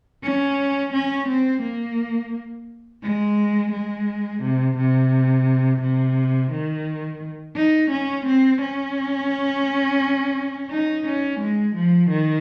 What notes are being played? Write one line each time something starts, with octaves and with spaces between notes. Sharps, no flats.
C#4
C#4
C4
A#3
G#3
G#3
C3
C3
C3
D#3
D#4
C#4
C4
C#4
D#4
C#4
G#3
F3
D#3